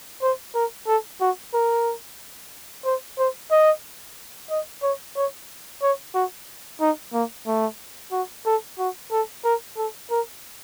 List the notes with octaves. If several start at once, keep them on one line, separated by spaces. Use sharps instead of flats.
C5
A#4
A4
F#4
A#4
C5
C5
D#5
D#5
C#5
C#5
C#5
F#4
D#4
A#3
A3
F#4
A4
F#4
A4
A#4
A4
A#4